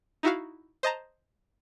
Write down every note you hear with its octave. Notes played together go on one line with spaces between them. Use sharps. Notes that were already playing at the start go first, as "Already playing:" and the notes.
D#4 E4 F#4 F5
C5 D#5 A5 A#5